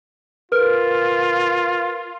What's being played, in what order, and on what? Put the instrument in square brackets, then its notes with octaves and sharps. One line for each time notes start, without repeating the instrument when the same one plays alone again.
[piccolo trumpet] F4 [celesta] A#4 B4 F6